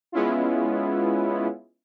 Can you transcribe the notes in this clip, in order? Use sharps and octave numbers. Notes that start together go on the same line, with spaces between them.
G#3 B3 C#4 E4 F4